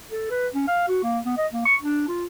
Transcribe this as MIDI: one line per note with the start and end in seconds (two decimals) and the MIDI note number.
0.11 0.27 69
0.30 0.48 71
0.54 0.65 61
0.68 0.87 77
0.88 0.99 66
1.03 1.19 58
1.25 1.36 59
1.37 1.47 75
1.53 1.65 58
1.65 1.75 85
1.81 2.08 62
2.08 2.25 65